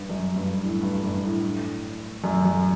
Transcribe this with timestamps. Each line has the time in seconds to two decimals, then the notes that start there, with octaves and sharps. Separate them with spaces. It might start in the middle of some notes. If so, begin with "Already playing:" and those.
Already playing: G2
0.09 F#2
0.36 G2
0.63 A2
0.83 G2
1.03 G2
1.23 A2
2.24 F#2
2.44 F#2